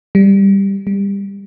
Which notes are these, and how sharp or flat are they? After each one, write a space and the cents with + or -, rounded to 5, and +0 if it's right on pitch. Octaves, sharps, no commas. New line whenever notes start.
G3 +5
G3 +25